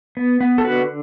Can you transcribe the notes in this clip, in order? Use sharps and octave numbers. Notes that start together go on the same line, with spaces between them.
B3
B3
A4
D3 F#4 B4